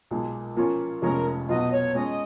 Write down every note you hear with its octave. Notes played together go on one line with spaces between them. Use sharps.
B1 A#2 G#3
A#2 F3 A#3 C#4 F4
F1 F2 F3 G#3 C#4 A#4
B1 B2 F#3 B3 F4 D#5
C#5
A#2 G#3 C#4 D#5